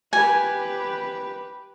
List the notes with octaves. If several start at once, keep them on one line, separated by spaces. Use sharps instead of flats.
G4 B4 G#5